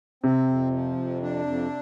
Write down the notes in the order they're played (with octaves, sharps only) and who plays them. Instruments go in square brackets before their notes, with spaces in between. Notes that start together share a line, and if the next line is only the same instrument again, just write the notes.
[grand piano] C3 [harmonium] C4
[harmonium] F2
F3
F2
D4
F2